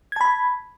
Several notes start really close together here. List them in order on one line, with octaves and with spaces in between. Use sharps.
G#6 A5 B5